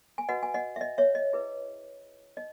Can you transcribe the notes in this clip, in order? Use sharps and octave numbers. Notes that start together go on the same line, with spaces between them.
G#5
F#4 B4 D#5 F#5
G#5
D#5 F#5
E5
D#5
C#5 E5
D#5
E4 G#4 B4
D#4 D#5